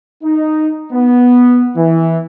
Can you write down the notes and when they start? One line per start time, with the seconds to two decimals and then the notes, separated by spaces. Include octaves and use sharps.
0.23 D#4
0.92 B3
1.76 E3